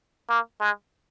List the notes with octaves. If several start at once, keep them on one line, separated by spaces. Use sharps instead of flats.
A#3
G#3